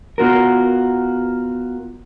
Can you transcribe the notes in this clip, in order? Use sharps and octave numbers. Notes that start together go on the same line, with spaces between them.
B3 F4 F#4 A#4